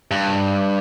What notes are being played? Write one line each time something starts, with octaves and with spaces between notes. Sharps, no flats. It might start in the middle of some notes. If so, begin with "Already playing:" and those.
G2